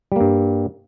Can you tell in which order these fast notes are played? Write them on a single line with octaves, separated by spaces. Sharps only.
G3 A#3 G2